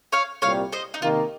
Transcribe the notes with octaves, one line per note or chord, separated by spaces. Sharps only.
C#5 F5
C2 A#2 G3 C4 C#5 F5
C5 D#5
D#4
C3 D#3 A#3 F4